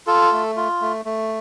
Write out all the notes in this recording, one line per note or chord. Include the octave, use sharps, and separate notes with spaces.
F4 A4
A3
F4
A3
A3